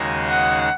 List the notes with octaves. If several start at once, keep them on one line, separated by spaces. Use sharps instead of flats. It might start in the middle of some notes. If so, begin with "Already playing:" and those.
Already playing: D#2 C#3 G#3 D#4 F#4
F#5